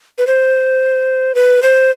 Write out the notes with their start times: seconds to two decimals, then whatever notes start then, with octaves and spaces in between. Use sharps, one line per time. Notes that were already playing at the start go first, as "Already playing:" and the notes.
0.18 B4
0.27 C5
1.35 B4
1.63 C5